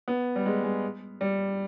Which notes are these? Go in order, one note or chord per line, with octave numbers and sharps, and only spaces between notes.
B3
G3
G#3
G#3
G3